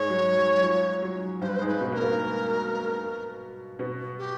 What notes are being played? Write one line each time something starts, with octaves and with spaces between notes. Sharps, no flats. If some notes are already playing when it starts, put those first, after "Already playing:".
Already playing: G#2 G#3 C#5
F#3
F#3
F3
F#3
G2 G3 C5
B4
C5
G#2 G#3
B4
B2 B3
A#3 A#4
B2 B3
B2 B3
G4